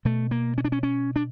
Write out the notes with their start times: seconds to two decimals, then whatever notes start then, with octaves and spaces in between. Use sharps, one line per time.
0.05 B2 A3
0.31 A#3
0.58 C#4
0.65 D4
0.72 C#4
0.83 C#4
1.16 D4